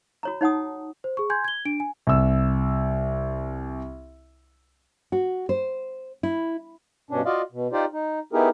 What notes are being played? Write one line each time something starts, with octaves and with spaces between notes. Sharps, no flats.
F#4 C#5 A#5
D#4 C#5 F#5 A5 D#6
C5
G#4 C#6
G#5 C6 G6 G#6
G#6 G7
D4 D7
G#5
C2 E6
F#4
C5
E4
G2 B2 C#4 D4
F4 F#4 D5 D#5 F5
B2
D#4 F4 G4 C5 D5
D#4
B3 D#4 E4 G4 G#4 A#4